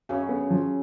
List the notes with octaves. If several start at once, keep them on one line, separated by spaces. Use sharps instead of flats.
F#2 C#3 F#3 C#4
B3
F3